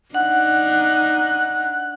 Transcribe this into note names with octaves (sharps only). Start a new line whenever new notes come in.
D4 D#4 F#5 F#6